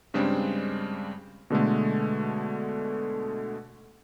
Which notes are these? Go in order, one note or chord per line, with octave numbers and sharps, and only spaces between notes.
G2 C#3 G3 G#3 C4 D4
B2 D3 G#3 A3